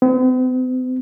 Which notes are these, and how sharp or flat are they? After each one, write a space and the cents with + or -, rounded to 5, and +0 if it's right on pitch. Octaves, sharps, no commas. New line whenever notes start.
C4 -45